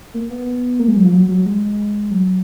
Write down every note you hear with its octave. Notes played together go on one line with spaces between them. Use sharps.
A#3
B3
A#3
G#3
F#3
F3
F#3
F#3
G#3
F#3